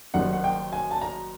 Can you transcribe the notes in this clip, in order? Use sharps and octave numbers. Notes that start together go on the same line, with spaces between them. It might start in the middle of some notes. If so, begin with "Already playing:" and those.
F#1 F#2 D#3 G3 F#5
F#5
G5
G#5
A5
A#5